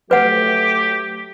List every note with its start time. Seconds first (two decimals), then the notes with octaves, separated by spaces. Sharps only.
0.11 F#3 A3 G4 B4 F#5